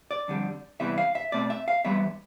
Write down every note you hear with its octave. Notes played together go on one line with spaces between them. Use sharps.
D5
F2 D3 G3
C3 E3 G3 B3 E5
F5
E5
B2 A3 C4 D5
E5
F5
G2 E3 G3 B3 E5